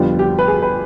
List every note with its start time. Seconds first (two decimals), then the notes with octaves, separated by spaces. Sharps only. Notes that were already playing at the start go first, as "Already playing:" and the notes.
Already playing: F2 D3 G3 B3 F4
0.19 G4
0.39 B4
0.48 G#4
0.63 B4